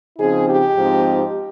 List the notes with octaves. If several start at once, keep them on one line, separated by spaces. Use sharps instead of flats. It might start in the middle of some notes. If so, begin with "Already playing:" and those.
C#3 F3 C4 D#4 G#4
G4
G#2 F3 C4 D#4